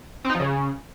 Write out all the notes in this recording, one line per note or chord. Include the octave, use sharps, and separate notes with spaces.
C4
D#4
F3
C#3